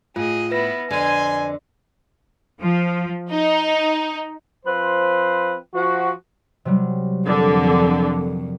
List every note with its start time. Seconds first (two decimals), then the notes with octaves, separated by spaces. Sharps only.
0.16 A2 F4 G#4 D#5
0.51 B3 E4 B4 A#6
0.91 F2 D3 G#5 C6
2.61 F3
3.31 D#4
4.66 F3 C4 B4 C5
5.74 F3 F#4
6.65 C3 F#3 G3
7.27 F2 D3 A#4